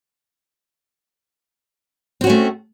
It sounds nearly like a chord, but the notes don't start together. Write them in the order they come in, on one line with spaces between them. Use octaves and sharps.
C4 F#4 C#4 A3